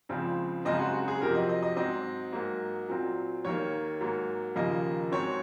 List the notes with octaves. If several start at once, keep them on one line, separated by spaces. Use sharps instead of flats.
C#2 C#3 F3 C4
F#2 C#3 G#3 C4 D#5
F#4
F#4
G#4
F2 C3 F#3 C4 A#4
D#5
D#5
D#5
G#2 F#3 C4 D#5
G#2 F#3 A#3
A#2 F#3 C4
D#2 D#3 A#3 C#5
G#2 F#3 A#3
D#2 C#3 F3 A#3 D#5
G#2 F#3 C4 C#5